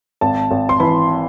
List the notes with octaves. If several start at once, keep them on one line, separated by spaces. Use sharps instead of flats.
G#1 A5
G#1
C6
E3 B5